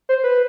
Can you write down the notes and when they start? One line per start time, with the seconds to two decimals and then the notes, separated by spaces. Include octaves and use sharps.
0.09 C5
0.24 B4